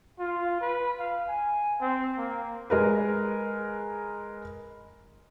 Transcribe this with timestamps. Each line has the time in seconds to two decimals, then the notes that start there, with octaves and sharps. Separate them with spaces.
0.19 F4
0.61 B4
0.99 F5
1.28 G#5
1.81 C4
2.18 A#3
2.70 G#3 A#4 B4